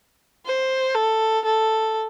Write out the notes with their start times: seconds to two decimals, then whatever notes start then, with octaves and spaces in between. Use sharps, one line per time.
0.46 C5
0.95 A4
1.45 A4